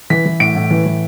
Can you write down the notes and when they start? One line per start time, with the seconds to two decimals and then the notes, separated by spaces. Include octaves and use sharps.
0.10 E3 B6
0.25 E3
0.40 A2 D7
0.56 A2
0.70 E3
0.86 E3